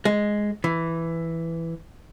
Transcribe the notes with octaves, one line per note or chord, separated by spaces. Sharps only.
G#3
E3